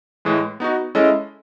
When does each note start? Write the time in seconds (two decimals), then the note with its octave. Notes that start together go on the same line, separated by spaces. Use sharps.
0.25 A2 E3 G#3
0.60 B3 D#4 F#4
0.95 G#3 C#4 E4 A4 D#5